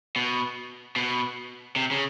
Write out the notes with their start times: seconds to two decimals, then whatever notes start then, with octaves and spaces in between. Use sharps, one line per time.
0.16 B2
0.96 B2
1.76 C3
1.91 C#3